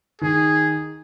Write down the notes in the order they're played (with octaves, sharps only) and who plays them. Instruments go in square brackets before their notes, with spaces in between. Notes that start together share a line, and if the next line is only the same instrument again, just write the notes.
[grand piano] D#3 [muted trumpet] G#4